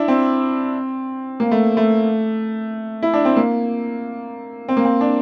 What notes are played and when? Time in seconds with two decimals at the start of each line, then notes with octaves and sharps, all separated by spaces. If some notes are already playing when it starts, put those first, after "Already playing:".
Already playing: D4 E4
0.08 C4
1.40 A#3
1.51 A3
1.77 A3
3.03 E4
3.14 D4
3.25 C4
3.36 A#3
4.69 C4
4.77 A#3
4.85 C4
5.01 D4